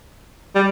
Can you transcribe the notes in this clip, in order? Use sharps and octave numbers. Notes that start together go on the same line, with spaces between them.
G3